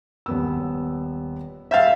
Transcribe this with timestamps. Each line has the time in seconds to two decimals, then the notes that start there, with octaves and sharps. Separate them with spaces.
0.26 D#1 B3 E6
1.71 E5 F5 E6 G6 A6